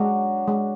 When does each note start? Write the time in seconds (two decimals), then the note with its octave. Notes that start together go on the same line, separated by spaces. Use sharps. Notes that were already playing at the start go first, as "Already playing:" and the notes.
Already playing: F#3 G#3 D4 F#4
0.48 G#3